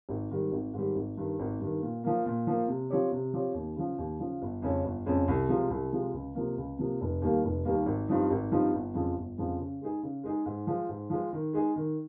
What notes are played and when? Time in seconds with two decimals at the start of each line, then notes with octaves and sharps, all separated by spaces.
0.09 G#1
0.31 G#2 D#3 G3
0.52 G#1
0.74 G#2 D#3 G3
0.95 G#1
1.17 G2 D#3
1.39 G#1
1.60 G2 D#3
1.82 A#2
2.04 F3 A#3
2.26 A#2
2.47 F3 A#3
2.68 C3
2.90 F3 C4 G4 C#5
3.12 C3
3.33 F3 C4 G4 C#5
3.54 D#2
3.76 C#3 F3
3.98 D#2
4.19 C#3 F3
4.42 G1
4.62 F2 C#3 G#3 C#4
4.84 G1
5.06 F2 C#3 G#3 C#4
5.28 C2
5.49 C3 F3 G#3
5.70 C2
5.92 C3 F3 G#3
6.13 C#2
6.35 C3 F3 A#3
6.57 C#2
6.79 C3 F3 A#3
7.01 F1
7.22 D#2 D#3 G3 A#3
7.44 F1
7.65 D#2 D#3 G3 A#3
7.86 G#1
8.08 G2 F3 C4 D#4
8.30 G#1
8.52 G2 F3 C4 D#4
8.73 G1
8.94 F2 C#3 F3 G#3
9.16 G1
9.38 F2 C#3 F3 G#3
9.59 C#3
9.81 G#3 D#4 G#4
10.03 C#3
10.24 G#3 D#4 G#4
10.46 G#2
10.67 F3 G#3
10.89 G#2
11.10 F3 G#3
11.33 D#3
11.53 G#3 D#4 G#4
11.76 D#3